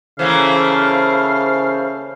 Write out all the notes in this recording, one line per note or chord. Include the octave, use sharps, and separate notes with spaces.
C#3 E3 A3 A#3 C5 F5